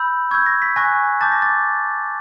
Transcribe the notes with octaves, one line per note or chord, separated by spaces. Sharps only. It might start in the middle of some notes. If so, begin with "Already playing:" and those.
Already playing: B5 E6 G6
C#6 E6 G6 G#6
A#6
B6
G#5 C#6 F#6 A#6
A5 D6 G6 A6
A#6
A6